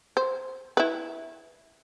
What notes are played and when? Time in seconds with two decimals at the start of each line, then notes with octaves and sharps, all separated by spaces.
0.17 C5
0.77 E4 B4